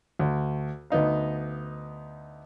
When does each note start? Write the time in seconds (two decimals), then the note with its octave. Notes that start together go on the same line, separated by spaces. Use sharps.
0.19 D2
0.90 D2 B3 D#4 F5